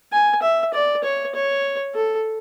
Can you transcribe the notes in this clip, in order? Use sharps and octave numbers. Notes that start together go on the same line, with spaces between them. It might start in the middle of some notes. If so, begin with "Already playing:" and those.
G#5
E5
D5
C#5
C#5
A4